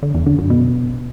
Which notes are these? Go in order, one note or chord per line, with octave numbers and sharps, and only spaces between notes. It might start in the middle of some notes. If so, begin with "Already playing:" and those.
D3
E2
D3
F#2
B2